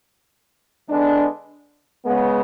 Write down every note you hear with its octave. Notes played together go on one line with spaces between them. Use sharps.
D3 G#3 B3 D4
C#3 G#3 B3